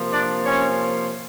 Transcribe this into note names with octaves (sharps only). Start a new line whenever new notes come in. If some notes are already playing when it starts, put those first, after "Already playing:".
Already playing: C3 F3 A#3
D4 D5
C#4 C#5